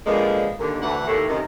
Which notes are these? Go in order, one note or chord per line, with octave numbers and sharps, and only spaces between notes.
A#2 D3 F3 G#3 A#3 B3
D#2 D3
D2 E3 F#5
D#2 A2
F#2 C3 D#3